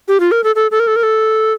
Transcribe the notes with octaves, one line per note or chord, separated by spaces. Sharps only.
G4
F4
A#4
A4
A4
A4
A#4
A4
A#4
A4